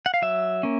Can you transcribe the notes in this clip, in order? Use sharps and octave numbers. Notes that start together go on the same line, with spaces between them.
F#5
F5
F#3 E5
A#3 C#4